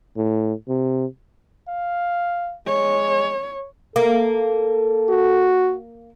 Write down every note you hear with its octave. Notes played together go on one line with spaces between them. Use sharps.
A2
C3
F5
G#3 C#5
A#3 A4
F#4